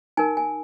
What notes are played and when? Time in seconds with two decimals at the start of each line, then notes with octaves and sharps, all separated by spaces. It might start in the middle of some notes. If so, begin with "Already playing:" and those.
0.17 D#4 A#4 G#5
0.37 G#5